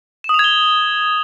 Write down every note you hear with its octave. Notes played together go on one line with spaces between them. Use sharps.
D#6 G#6 E7 F7 G7